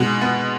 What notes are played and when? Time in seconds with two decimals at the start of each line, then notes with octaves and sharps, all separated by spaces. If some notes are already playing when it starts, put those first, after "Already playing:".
Already playing: B2 G#3
0.21 B3